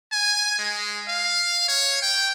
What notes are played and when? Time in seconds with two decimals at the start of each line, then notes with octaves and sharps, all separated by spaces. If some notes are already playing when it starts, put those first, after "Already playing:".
0.12 G#5
0.59 G#3
1.08 F5
1.69 C#5
2.03 G5